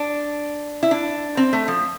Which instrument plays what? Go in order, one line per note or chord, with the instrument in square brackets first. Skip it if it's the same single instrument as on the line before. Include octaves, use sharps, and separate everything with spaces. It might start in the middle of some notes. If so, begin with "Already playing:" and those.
Already playing: [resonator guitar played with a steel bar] D4
E4
D4
C4
A3
F3